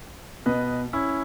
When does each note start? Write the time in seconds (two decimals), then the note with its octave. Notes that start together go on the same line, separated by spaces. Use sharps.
0.46 B2 B4 D#5
0.93 C#4 E4